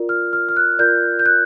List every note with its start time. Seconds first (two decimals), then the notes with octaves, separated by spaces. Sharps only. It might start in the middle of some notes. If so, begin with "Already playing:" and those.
Already playing: F4 A#4 D5
0.09 F6
0.33 F6
0.49 F6
0.56 F#6
0.79 F4 A#4 D5 G6
1.19 G6
1.26 F#6